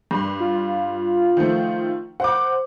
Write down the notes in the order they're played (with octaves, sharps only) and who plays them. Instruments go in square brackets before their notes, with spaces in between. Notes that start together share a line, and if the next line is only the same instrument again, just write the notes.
[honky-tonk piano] G2 C6
[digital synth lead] F4
[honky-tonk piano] D#3 F3 A3
[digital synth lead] C5 [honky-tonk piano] F#5 D6